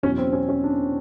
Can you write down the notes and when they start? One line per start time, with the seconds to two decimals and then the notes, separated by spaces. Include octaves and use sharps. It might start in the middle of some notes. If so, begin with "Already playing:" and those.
0.03 E2 B2 F#3 C#4
0.18 C4
0.33 C#4
0.49 C#4
0.64 D4